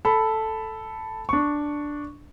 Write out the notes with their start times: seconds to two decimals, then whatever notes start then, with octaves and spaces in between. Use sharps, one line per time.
0.05 A4 B5
1.29 D4 C#6